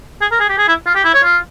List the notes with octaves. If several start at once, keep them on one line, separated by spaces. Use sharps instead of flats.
G#4
A#4
G#4
G4
G#4
E4
F4
G4
E4
C#5
F4